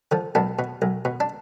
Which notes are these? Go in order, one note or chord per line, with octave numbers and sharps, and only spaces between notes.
D3 F3
B1 B3 D4
B2
B1
B2
D4